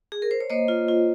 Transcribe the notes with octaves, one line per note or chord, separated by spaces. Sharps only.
G#4
A#4
C5
C#5
A#3 C5 D#5
F4
F4